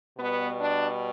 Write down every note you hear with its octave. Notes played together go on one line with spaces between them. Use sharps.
B2 G3 B3
D4